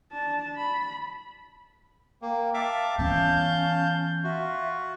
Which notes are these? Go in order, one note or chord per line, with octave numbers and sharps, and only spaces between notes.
D4 A5
B5
A#3 G5
E5 F5 A5 D6
E3 B3 C#4 F5 A5 G6
F4 F#4 E5